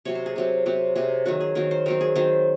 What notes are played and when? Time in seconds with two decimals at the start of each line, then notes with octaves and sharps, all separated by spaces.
0.05 C3 F#3 C4 C#5
0.15 C5
0.26 G#4
0.36 C3 F#3 C4
0.66 C3 F#3 C4
0.96 C3 F#3 C4 G#4
1.26 D#3 F#3 C4 F#4
1.41 G#4
1.55 D#3 F#3 C4 A#4
1.71 C5
1.86 D#3 F#3 C4 A#4
2.01 G#4
2.15 D#3 F#3 C4 C5